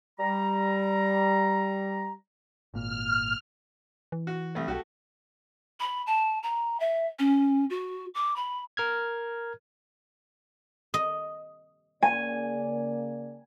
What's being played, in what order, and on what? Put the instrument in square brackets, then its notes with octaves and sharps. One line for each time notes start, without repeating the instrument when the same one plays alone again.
[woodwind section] G3 A#5
[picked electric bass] G#1 A#2 [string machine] F6
[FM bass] E3
[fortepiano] F#4
C2 A3
[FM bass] B1 [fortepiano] F#4 G4 A4
[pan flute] B5
A5
A#5
E5
C#4
F#4
D6
B5
[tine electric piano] A#4 F6 G#6
[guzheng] D#5
[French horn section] C#3 A#3 D5 [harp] G#5